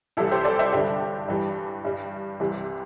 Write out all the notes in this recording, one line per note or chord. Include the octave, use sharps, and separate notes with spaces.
C2 C3 E3 G3 E4 A4
G4 C5
A4 D5
C5 E5
G2 D3 G3 D4 G4
G2 E3 G3
G2 G3
C2 C3 E3 G3